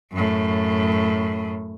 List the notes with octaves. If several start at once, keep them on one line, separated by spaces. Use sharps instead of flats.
F#2 A2